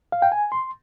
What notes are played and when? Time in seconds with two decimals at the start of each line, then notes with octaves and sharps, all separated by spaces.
0.12 F5
0.22 G5
0.32 G#5
0.52 C6